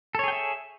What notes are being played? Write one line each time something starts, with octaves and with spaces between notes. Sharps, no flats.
G#4 A4 C#5 E5 G5